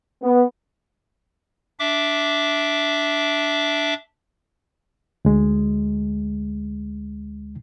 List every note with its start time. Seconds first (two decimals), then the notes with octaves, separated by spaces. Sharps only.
0.23 B3
1.79 D4 E5 D6
5.25 D2 G#3